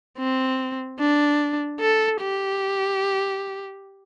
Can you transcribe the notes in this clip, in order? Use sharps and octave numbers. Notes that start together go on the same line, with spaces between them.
C4
D4
A4
G4